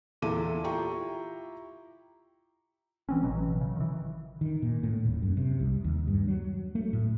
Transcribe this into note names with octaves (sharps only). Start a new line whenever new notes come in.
E2 A#2 E4 A4 D6 D#7
E4 F4 G4 G5 A#5 C#6
E3 C4 C#4
A1 B2 E3 F#3
C#3
D#3 E3
D#3
A#2
A2
D#1
F#2
C3
C2
D#2
G2
F#3
A3
A2